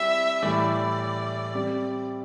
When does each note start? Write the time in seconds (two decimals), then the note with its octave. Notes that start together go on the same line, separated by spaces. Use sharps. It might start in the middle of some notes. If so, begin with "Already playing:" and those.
Already playing: G3 C4 E4 G4 E5
0.42 A2 E3 G3 E4 D5
1.54 G3 C4 G4